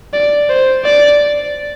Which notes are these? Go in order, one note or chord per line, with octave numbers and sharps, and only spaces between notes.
D5
C5
D5